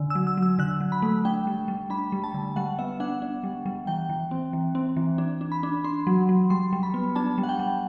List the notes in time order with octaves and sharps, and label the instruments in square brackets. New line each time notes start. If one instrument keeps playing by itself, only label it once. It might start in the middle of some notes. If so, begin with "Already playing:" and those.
Already playing: [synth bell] D3
E6
F#3
E6
F#3
E6
D3 F#6
F#3
B5
A3
D4 G5
G3
G3
D4 B5
G3
A5
D3
G3 F#5
B3 E5
D4 F#5
D4
G3
G3
E3 G5
E3
C4
E3
C4
E3
D4
D4
B5
D4
D4 C6
F#3
F#3
G3 C6
G3
B5
B3
D4 A5
G3
F#5
G5
G3